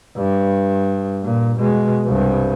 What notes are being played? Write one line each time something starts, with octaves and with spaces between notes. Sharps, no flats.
G2
A#2
B2 G#3
C2 G2